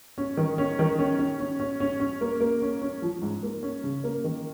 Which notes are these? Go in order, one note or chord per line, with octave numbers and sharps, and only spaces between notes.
C#4
D#3
C#4
D#3
C#4
C#4
C#4
C#4
C#4
C#4
A#3
A#3
C#4
C#4
F3
G#2
A#3
C#4
C#3
A#3
D#3